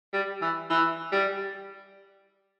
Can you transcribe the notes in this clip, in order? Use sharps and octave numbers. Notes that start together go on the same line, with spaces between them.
G3
E3
E3
G3